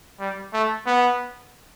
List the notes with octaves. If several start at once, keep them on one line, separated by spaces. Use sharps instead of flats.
G3
A3
B3